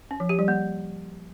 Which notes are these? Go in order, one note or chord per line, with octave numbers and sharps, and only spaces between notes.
C#4
F3
G4
G3
A#3